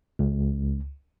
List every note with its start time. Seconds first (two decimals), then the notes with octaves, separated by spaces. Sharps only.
0.19 C#2